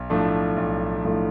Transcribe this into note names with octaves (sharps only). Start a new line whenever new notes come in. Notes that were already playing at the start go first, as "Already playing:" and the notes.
Already playing: B1
A2 F3 A3 D4
B1
A2 F3 A3 D4